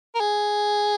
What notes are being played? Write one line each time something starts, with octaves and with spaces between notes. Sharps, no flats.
A#4
G#4